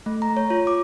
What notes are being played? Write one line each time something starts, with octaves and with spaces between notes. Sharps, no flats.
A3
A#5
C#5
F4
D6